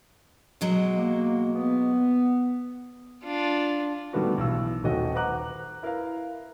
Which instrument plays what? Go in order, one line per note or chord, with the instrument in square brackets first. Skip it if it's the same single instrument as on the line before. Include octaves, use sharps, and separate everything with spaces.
[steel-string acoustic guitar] B2 F#3 G#3
[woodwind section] A#3
B3
[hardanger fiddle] D4 F4
[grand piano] D3 D#3 G3 A3 B3 F#4
B1 E3 E6
D#1 D#3 A3 F#4 D#5 G5
B4 C5 F#5 A#5 D6 F#6
E4 A#4 B4 F5